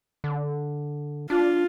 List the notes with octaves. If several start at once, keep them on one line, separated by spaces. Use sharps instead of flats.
D3
D4 F4